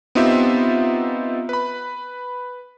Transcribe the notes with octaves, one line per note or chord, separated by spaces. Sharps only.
B3 C4 D#4 F4 G4 E5
B4 B5